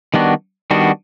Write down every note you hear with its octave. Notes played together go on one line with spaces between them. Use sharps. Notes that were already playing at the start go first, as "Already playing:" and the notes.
D#3 G3 B3 D4 F#4
D#3 G3 B3 D4 F#4